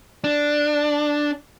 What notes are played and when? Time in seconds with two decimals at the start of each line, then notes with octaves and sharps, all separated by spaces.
0.24 D4